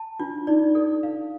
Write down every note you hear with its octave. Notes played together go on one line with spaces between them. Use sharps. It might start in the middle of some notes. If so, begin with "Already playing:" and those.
Already playing: A5
D4 F4
D#4 D5
A4 D5
F5